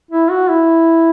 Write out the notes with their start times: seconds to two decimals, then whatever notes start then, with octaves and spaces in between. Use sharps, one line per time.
0.11 E4
0.30 F#4
0.48 E4